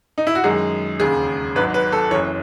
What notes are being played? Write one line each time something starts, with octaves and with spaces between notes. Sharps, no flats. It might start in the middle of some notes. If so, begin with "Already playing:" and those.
D#4
E4
F#4
F#2 D#3 G#3 G#4
E1 D#2 C#3 G#4
G#1 G#2 F#3 B4
B4
A4
F#1 F#2 E3 C#5